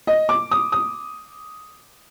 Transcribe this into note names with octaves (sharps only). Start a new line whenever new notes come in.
D#5
D6
D#6
D#6